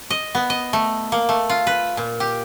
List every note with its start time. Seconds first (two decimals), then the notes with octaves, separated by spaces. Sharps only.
0.10 D#5
0.35 B3
0.50 D#5
0.73 A3
1.12 A#3
1.29 A3
1.49 F4
1.67 B4
1.97 A#2
2.20 G4